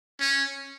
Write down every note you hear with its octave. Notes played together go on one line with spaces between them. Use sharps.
C#4